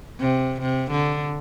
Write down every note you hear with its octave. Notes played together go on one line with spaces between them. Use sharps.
C3
C3
D3